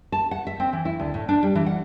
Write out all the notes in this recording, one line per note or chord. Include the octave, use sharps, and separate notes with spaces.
A5
F#5
E5
C4
E3
E4
D2
A2
D4
G3
E3
F#5